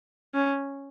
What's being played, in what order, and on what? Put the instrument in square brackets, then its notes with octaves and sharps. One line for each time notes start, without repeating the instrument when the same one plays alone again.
[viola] C#4